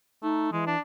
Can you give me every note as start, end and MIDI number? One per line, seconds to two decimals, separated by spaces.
0.23 0.48 57
0.23 0.50 63
0.52 0.75 52
0.52 0.66 56
0.67 0.79 62